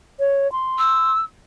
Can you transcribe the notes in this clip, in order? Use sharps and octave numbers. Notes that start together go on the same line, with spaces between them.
C#5
C6
E6